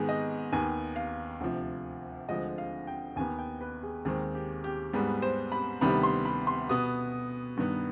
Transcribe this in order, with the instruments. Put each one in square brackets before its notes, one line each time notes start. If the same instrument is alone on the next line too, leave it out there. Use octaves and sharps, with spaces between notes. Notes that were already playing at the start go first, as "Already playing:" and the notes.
Already playing: [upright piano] G#2 D#3 B3 G#4
D#5
D#2 D#3 B3 G#5
F5
D2 C3 F3
D2 D3 F3 G#3 C4 D#5
F5
G5
D#2 D#3 B3 G#5
G5
B4
G#4
D#2 D#3 G#3 C4 G#4
G4
G4
G#2 G3 B3 G#4
C5
B5
D2 C3 D#3 G3 B3 B5
C6
B5
C6
B2 B3 D#6
G2 D#3 B3